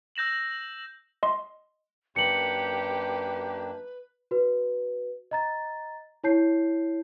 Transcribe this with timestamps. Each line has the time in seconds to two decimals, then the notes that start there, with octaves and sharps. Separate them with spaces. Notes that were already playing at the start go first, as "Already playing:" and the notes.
0.16 E6 G6 A#6 E7 F#7
1.23 D#5 C6
2.16 F#2 A#3 D4 G4 B4 C#7 F#7
4.31 F#4 B4
5.31 D#5 A#5 A6
6.24 E4 C#5 A5 G6 C7